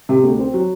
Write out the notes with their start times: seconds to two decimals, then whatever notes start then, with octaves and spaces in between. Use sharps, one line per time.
0.09 C3
0.23 D2
0.39 C4
0.54 F#3